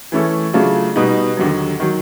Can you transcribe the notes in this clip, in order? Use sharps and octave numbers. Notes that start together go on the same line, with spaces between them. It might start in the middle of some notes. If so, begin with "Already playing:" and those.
E3 A3 C#4 E4 A4
C#3 F#3 A3 D4 F4
B2 G3 B3 D#4
D#2 D3 F#3
D#3 F#3